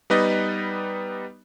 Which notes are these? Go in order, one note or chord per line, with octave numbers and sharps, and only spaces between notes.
G3 B3 D#4 B4 D5 D#5